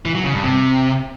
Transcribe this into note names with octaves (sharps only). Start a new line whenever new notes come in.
E3
F#3
C#3
G2
C3